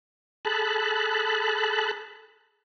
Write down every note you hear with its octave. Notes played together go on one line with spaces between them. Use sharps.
G#4 A4 A5 B5 F#6